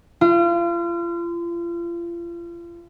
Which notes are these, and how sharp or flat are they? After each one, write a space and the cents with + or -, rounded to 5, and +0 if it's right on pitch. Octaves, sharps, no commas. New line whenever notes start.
F4 -35